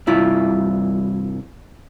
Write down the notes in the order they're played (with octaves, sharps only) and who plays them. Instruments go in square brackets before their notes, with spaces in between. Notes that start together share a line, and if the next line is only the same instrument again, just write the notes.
[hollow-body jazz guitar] C2 G2 E4 F4